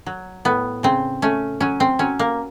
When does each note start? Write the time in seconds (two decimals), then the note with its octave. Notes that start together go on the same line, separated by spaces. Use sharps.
0.06 F#3
0.45 A2 B3
0.83 C#3 C4
1.22 A3 C#4
1.60 F#3 C#4
1.80 C4
1.99 F#3 C#4
2.19 A#3